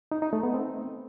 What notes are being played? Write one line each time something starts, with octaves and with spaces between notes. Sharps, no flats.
D#4
D#4
A3
B3
C4